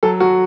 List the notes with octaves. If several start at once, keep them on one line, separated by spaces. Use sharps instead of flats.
F#3 A4
F#3 F#4